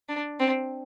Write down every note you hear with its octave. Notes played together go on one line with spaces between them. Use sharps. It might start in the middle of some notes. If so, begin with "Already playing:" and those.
D4
C4